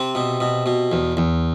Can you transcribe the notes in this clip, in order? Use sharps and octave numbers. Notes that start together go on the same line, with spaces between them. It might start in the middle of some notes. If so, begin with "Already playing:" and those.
Already playing: C3 C4
B2
B2
B2
E2
E2